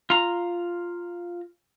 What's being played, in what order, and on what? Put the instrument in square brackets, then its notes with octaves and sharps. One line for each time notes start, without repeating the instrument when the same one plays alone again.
[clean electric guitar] F4 A#5